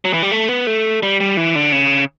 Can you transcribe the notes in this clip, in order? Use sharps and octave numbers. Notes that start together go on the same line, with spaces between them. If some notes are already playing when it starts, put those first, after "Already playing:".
F#3
E3
G3
A3
B3
A3
G3
G3
E3
D3
C#3